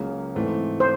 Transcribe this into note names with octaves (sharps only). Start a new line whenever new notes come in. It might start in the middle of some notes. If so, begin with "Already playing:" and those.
Already playing: C#2 C#3 F#3 A#3
G#2 E3 A3 C4
C5